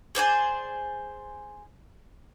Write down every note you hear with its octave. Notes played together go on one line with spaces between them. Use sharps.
G#4 C5 D5 G#5